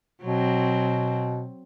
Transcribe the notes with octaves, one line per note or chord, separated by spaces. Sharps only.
B2 F#3 C4